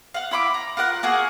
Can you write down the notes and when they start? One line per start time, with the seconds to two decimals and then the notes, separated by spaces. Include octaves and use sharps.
0.14 F5 F#5
0.31 E4 B5 C6 D6
0.54 A#5
0.77 F4 A#4 F#5 F#6
1.03 A#3 F#4 G#4 F#5